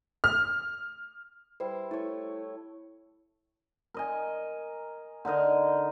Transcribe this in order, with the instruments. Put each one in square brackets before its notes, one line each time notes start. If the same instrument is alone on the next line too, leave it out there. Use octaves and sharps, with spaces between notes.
[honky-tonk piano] F6
[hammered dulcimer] G3 E4 C6 [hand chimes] B4 C5
[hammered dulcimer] A3 C#5 [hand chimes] E4
[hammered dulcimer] A#4 D#5 G#5
D3 D#4 A#4 D#5